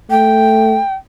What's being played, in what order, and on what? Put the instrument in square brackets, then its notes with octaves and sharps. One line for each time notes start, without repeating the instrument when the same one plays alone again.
[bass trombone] A3 [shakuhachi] G5